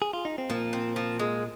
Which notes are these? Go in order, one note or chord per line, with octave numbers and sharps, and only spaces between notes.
G#4
F4
D#4
C4
A#2 F3 A#3
C4
F3
G#3